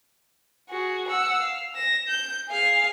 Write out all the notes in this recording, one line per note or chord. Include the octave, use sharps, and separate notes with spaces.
F#4 G#4
F#5 E6
F5
A#6 E7
G6
G#4 F5